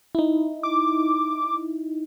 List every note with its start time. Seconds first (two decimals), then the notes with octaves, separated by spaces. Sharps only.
0.15 D#4 E4
0.63 D6